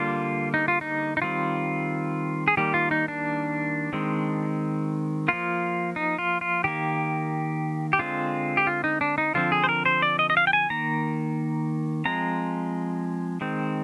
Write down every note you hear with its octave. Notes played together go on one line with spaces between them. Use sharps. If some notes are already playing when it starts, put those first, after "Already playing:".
Already playing: D3 G3 A#3 F4
D#4
F4
D#4
D#4
D#3 G3 C4 F4
G#4
D#3 G3 A#3 G4
F4
D#4
D4
D#3 G#3 C4
F3 A#3 F4
D#4
F4
F4
D#3 A#3 G4
G4
D3 G#3 C4 F4
G4
F4
D#4
D4
D#4
D3 F3 C4 F4
G#4
C5
A#4
C5
D5
D#5
D#5
F5
G5
G#5
D#3 A#3 A#5
F3 G#3 C4 A#5
D#3 G#3 C4